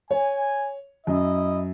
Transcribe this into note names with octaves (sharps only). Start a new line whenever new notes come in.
C#5 G#5
F#2 E4 D#5